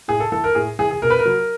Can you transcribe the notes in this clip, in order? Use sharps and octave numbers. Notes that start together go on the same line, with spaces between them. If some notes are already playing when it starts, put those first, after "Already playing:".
A2 G#4
A4
E3 A4
A#4
A2 G#4
E3 G#4
G#4
B2 A#4
B4
A#4
F#3